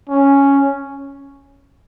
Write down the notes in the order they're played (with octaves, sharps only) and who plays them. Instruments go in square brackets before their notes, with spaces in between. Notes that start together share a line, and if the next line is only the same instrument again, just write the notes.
[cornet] C#4